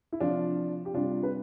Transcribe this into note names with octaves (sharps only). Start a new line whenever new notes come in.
E4
C3 F3 D4 F4
G4
C3 G3 D4 F4
B4